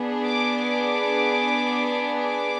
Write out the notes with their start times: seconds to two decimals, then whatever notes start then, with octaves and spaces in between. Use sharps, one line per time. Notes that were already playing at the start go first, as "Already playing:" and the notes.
Already playing: B3 D4 G#4
0.24 D6
0.64 D6
2.20 D6